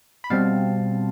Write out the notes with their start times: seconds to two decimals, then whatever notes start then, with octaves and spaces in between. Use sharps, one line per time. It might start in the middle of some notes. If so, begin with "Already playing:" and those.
0.24 B5
0.30 B2 G3 C4 F5 A5